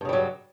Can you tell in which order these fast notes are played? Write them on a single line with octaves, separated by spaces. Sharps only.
G2 C#3 G3 F#3